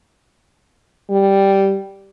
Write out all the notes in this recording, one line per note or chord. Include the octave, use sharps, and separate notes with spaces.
G3